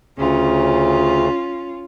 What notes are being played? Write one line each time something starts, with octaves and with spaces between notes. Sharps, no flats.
D2 C#3 C#4 F4